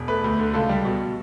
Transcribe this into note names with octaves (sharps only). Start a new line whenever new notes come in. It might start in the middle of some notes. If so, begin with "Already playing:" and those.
Already playing: E1
A3 B4
D2
D3
C#2 A4
G3
B2